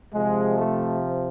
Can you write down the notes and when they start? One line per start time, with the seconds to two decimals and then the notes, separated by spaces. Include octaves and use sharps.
0.13 C3 F3 G#3
0.57 A3